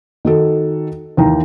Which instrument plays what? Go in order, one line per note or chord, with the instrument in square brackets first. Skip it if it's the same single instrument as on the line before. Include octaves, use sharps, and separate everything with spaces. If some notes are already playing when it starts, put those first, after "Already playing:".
[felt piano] D#3 F#4 A4
D#2 E3 G5 A#5